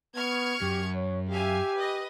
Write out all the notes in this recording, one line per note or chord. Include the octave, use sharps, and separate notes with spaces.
B3 C#6 F6 G#6
F#2 G4
C#5
G4 E5 F5 G#5
B4 D#5